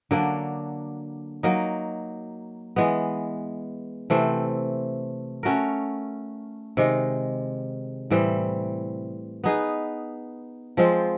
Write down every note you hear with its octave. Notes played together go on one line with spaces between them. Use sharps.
D3 F#3 A#3 D4
F#3 A#3 D#4
E3 G#3 B3
C3 E3 A3 C4
A3 C#4 F#4 A#4
C3 D#3 G#3
A2 E3 G3 C4
B3 D#4 G#4 B4
F3 G#3 C4 F4